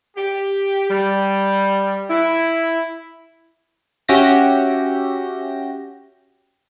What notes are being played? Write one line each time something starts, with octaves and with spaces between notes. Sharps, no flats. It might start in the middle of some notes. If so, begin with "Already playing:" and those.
G4
G3
E4
C#4 F#4 G4 E5 G6 A#6